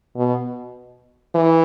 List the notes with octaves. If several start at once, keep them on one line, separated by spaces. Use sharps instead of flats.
B2
E3